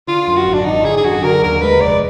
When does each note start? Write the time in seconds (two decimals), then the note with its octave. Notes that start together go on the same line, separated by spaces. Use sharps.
0.08 D3 F4
0.28 F#2
0.37 F#4
0.46 G#1
0.54 D4
0.65 G#1 D#4
0.85 D3 G#4
0.97 G#4
1.04 F#2 F#4
1.24 D3 A#4
1.43 D#2 A#4
1.62 G#3 B4
1.81 F1 D5